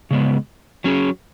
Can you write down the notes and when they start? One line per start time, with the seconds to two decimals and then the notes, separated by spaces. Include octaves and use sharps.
0.11 C#3 G#3 B3
0.84 F#3 C#4 G#4